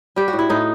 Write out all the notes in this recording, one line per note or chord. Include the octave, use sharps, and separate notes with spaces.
G3 G4
F#4
A2
E4
A2 D#4